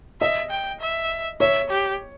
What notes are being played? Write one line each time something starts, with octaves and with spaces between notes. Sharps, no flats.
D#5 E5
G5
E5
C#5 E5
G4